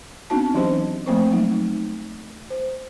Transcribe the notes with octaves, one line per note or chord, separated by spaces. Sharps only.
B3 C4 D4 D#4 F#4 A5
E3 F#3 C#4 G4 C5 D#5
F3 A3 A#3 C4 C5 C#6
F3 F#3 G#3 D#4
C5